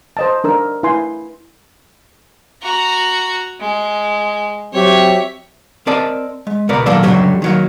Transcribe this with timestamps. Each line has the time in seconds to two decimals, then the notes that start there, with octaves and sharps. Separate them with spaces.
0.17 C5 D#5 A5
0.44 D4 A#4 E6
0.83 E4 B4 G#5 C6
2.62 F#4 A#5
3.60 G#3
4.73 F#3 C4 G4 C#5 E5
5.87 C4 A#4 D5 D#5 A5
6.47 G#3
6.69 C#2 B2 B3 A#4 D5 A#5
6.86 B1 D#3 F#3 A#3 A4 D5
7.03 C#2 F#2 A2 D3 F#3 G3
7.42 D#3 F#3 A#3